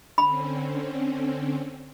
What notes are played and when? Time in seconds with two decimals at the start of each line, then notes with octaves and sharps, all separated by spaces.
0.18 D3 C4 C#4 B5